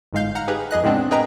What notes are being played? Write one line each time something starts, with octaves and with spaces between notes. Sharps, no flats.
G1 G#2 G#3 F5 G6
F#5 A#5 F6
D#4 G4 G#4 B4
F2 G#4 D#5 F#6
A2 C#3 G#3 B3 C4 D4
G#4 A#4 B4 D#5 G5 A#5